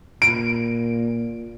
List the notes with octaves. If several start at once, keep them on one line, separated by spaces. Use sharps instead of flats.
A#2 D7